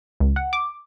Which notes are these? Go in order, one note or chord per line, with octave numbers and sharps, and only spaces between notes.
C#2
F#5
D6